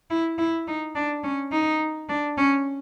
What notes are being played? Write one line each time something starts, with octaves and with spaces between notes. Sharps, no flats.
E4
E4
D#4
D4
C#4
D#4
D4
C#4